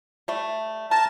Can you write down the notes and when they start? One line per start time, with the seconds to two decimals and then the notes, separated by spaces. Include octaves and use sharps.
0.28 G3 A3
0.91 A#4 A5